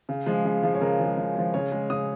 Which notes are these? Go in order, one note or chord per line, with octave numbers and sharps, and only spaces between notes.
C#3
F3 G#3
C#3
F3 G#3
C#5
C#3 A#4
F3 G#3
C#3
F3 G#3
C#3 C#5
G#3
C#3 D#6